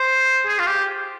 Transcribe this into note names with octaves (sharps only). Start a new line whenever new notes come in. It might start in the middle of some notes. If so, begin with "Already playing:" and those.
Already playing: C5
G#4
F4
G4